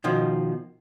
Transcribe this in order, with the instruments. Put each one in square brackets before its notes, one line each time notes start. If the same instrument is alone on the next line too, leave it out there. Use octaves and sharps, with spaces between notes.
[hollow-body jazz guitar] B2 D#3 F3